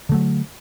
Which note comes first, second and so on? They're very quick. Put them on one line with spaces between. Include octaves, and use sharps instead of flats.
D3 A3 F#3